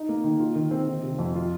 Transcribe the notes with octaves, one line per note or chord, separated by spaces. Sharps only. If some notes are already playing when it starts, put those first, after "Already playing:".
Already playing: D#4
A#3
D#3
F4
D#3
C4
D#3
C3
F2
F4